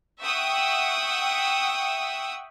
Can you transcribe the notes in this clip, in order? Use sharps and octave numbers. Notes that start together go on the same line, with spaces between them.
E5 F#5 G5 C#6 D#6 E6